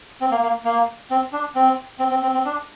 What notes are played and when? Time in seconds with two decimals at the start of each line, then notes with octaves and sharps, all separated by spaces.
0.21 C4
0.31 A#3
0.43 A#3
0.65 A#3
1.10 C4
1.33 D4
1.55 C4
1.99 C4
2.10 C4
2.23 C4
2.34 C4
2.45 D4